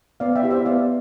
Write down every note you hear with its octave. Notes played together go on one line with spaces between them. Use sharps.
B3 D5 F5
E5 G5
E4 G4
C5 E5
B3 D5 F5